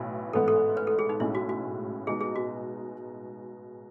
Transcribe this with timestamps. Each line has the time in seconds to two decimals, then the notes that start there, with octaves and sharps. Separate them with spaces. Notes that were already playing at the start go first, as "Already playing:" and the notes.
Already playing: B1 A2 E3
0.33 A1 G#2 E3 B3 A4
0.48 A4
0.77 B4
0.87 A4
0.99 G#4
1.09 D#4
1.20 B1 A2 G#3 C#4 E4
1.35 F#4
1.49 F#4
2.07 B2 G#3 D#4 G#4
2.21 G#4
2.36 F#4